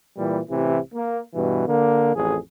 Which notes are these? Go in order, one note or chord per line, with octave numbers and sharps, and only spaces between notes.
A#2 E3 G3
A1 C3 E3
A#3
G2 B2 E3
D3 A#3
A1 F2 G#4